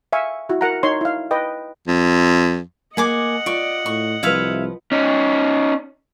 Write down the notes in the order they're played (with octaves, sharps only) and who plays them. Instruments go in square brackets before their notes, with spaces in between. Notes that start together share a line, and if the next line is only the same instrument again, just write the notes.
[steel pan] E5 F5 G#5 C#6
E4 F#4
A#4 F#5 A#5
D#4 C#5 C6
E4 F5
B4 D#5 G5
[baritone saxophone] F2
[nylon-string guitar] A#3 [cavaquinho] G#4 G#5 D6 [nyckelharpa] D#5 F#5
[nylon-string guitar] F4 [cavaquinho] D5 C#6
[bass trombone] A2 [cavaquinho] C#6
[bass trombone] C2 [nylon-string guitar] F3 F4 B4 [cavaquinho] C#5 E5 F5
[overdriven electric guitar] C#4 D#4